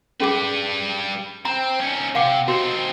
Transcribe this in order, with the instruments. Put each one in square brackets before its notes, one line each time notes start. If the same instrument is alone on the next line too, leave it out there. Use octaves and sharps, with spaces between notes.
[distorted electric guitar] G3 B4 [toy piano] C#4 G#4 D6
[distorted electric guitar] C4 [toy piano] A#5
[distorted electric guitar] C#4 D#4
[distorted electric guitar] C3 [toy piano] F5 F#5 D6
[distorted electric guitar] C4 D#4 [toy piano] F#4